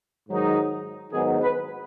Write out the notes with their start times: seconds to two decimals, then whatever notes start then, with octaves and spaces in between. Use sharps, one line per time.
0.28 G#2 D#3 F#3 D#4
1.12 G#2 D#3 F#3 B3 D#4 G#4
1.41 B4